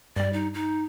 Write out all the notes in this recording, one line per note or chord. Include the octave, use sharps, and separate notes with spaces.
G2 G3 D5
D#4
D#4